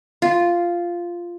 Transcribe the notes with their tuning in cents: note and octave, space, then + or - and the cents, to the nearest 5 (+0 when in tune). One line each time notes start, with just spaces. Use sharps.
F4 -5